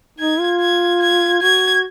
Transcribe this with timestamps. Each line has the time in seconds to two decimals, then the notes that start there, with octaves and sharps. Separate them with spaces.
0.19 D#4 G#6
0.40 F4
0.60 G#6
1.01 G#6
1.42 F#4 G#6